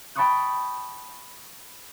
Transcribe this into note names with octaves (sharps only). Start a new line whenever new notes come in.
G5 A5 B5 C#6 D#6 F#6